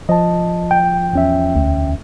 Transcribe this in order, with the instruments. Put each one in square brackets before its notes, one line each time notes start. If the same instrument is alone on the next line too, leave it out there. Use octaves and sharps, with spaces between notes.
[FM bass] F3 [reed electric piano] D#5 A5
[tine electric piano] G5
[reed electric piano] E2 C#4 E5
[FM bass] D2